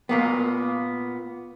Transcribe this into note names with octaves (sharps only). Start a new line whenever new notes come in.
A#2 A#3 B3